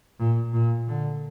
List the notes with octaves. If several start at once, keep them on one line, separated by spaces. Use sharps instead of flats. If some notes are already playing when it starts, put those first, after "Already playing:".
A#2
A#2
D3